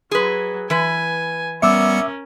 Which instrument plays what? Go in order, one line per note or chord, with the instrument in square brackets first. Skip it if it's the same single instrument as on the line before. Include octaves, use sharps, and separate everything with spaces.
[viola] F#3 [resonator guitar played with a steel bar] G#4 B4
[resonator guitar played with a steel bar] E3 B4 [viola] G#5
[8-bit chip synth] G3 B3 C#7 [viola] C#4 A#4 [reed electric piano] E5 D6 E6